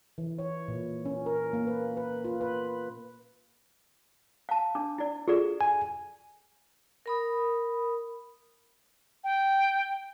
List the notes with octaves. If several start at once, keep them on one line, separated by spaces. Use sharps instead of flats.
E3
C#5
A#2
C#4
A#4
A#3
B4
B4
F4
B4
F5 A5
D4 D6
E4 D5 A6
F4 F#4 G#4 A4 D5 E7
G#5
A#4 B5 D#6
G5